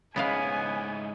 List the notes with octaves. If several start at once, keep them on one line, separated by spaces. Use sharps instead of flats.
G#2 C#3 G#3 B3 E4 F5 G#5